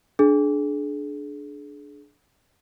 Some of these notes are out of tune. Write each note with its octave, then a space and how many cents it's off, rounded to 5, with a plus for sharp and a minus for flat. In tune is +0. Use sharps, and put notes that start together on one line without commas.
D4 +0 G#4 +30